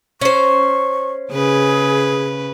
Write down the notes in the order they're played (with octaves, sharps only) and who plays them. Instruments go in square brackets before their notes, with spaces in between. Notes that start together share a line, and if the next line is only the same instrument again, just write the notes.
[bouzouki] C#4 C5 [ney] C#6
[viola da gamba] C#3 B4 [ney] G#4